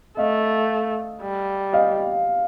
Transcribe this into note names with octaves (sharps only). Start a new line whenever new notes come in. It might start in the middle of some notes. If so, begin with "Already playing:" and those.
A3 D#5 F5
G3
D#5 F5